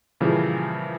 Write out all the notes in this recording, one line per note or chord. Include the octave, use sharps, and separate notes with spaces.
A#2 C#3 E3 F3 G3